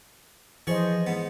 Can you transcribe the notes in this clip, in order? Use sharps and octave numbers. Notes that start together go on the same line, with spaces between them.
E3 F3 G#4 C5 D#5 C#6
G#2 B3